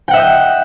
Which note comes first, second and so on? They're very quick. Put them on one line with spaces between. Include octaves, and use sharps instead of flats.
G5 F#5 E5 D#5 G6